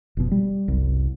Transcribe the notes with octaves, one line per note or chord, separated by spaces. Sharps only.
F1 B2
G3
F#1 C2